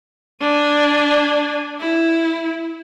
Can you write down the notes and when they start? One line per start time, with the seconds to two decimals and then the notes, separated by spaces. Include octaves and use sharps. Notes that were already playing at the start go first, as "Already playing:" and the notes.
0.40 D4 G#5
1.80 E4